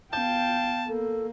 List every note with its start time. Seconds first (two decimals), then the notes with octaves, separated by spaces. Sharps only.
0.13 B3 F5 G5 A5 G6
0.88 A#3 A4